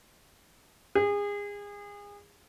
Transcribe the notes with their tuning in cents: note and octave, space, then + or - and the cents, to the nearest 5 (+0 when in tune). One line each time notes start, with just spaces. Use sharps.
G#4 -30